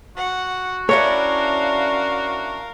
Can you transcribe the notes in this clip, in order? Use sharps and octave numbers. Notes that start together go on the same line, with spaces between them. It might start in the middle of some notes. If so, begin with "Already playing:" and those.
F#4 F#5
C#4 D4 E4 A#4 C#5 F5